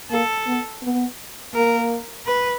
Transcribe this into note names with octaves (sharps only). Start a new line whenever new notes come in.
A#3 A4
B3
B3
A#3 A#4
B4